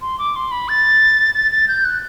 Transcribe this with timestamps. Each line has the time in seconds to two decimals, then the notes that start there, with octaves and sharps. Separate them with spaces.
0.01 C6
0.19 D6
0.36 C6
0.51 B5
0.68 A6
1.35 A6
1.52 A6
1.68 G6
1.85 F#6